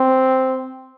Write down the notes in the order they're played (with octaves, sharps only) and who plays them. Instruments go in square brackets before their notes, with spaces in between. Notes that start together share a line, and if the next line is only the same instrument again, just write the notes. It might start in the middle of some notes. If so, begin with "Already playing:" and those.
Already playing: [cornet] C4